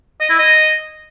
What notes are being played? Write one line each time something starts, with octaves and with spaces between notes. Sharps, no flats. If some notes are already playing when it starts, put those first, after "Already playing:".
D#5
E4
D#5